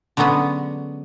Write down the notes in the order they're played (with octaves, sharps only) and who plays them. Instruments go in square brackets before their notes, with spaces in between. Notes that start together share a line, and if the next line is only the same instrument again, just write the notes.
[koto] D3 F#3 G#3 B3 C#4